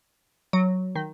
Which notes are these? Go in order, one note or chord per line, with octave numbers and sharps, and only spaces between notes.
F#3
D#3